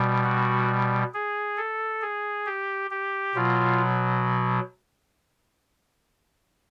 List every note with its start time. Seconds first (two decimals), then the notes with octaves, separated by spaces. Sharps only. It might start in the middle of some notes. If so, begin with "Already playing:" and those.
Already playing: B2 G3
0.24 F#4
1.14 G#4
1.57 A4
2.02 G#4
2.46 G4
2.91 G4
3.35 B2 F#3 F4